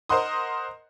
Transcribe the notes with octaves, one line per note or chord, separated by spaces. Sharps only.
A#4 C5 D#5 F#5 C6 D#6